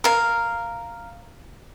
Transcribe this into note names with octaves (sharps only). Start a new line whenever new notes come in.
A#4 F5